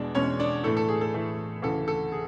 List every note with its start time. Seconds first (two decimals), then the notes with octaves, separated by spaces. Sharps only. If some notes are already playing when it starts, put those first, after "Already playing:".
Already playing: E2 B2 G#3 D4 D5
0.15 E2 B2 G#3 C#4 C#5
0.39 D4 D5
0.64 A2 E3 A3 A4
0.77 A4
0.89 G#4
1.01 A4
1.14 A2 E3 A3
1.62 D2 C#3 E3 A4
1.88 A4
2.12 G#4